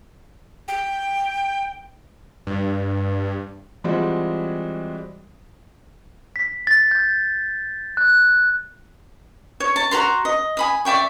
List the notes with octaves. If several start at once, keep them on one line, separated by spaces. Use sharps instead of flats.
G5
G2
E3 G3 G#3 C4 F4 F#4
B6
A6
G6
F#6
C#5
A5
F#4 B4 A#5 C6
D#5
G#5 B5 D#6
D5 E5 G5 C#6